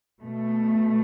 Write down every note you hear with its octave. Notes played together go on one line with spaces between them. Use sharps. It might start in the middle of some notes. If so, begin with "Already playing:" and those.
B2 A3